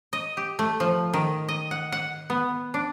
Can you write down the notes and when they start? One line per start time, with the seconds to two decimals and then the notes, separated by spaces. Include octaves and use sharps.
0.13 D#5
0.37 G4
0.59 A3
0.80 F3
1.13 D#3
1.49 D#5
1.71 F#5
1.92 F#5
2.30 B3
2.74 D4